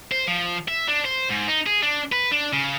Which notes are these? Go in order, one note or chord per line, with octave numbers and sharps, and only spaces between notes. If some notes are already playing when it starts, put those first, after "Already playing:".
C5
F3
E5
D4
C5
G#2
D#4
G#4
D4
B4
D4
C#3